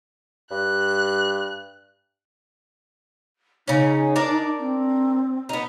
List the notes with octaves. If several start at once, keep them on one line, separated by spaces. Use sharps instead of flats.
G2 F#6
C#3 C#4 D#4
D4 A#4 D5
C4
B3 D#4